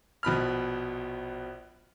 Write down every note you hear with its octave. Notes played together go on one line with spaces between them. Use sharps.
A#1 B2 B5 F6